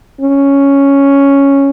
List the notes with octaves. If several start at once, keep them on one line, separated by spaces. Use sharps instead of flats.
C#4